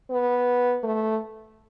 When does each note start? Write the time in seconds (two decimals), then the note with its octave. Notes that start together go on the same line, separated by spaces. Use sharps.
0.10 B3
0.84 A3